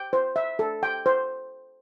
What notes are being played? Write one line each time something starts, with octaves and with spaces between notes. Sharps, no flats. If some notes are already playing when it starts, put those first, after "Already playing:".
Already playing: G5
C5
E5
A4
G5
C5